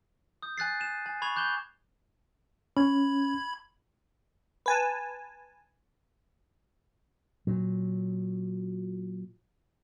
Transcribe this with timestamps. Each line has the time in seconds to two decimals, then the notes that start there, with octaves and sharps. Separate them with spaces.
0.42 D#6 G6
0.58 G#5 F#6 A6 C7
0.80 D#7 E7
1.06 G#5
1.22 B5 C#6 G#6 F7
1.36 D6 F#6 G6 E7 G7
2.77 C#4 B5 G#6
4.66 B4 G#5 A5
7.47 A#2 F#3